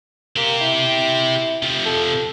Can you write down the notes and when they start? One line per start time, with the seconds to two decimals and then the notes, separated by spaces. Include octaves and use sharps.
0.36 A#3 C4 G4
0.61 E4
1.63 C3 F3
1.85 A4